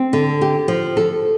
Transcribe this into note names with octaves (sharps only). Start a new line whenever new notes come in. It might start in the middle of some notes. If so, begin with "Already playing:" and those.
Already playing: C4
D3
G4
F3
A4